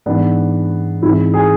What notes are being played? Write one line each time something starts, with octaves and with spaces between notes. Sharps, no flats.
G#2 E3 B3 D4
G#2 E3 C4 E4
G#4